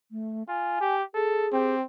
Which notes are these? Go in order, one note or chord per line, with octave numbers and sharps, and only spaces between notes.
A3
F4 G#5
G4
G#4 A4
C4 G4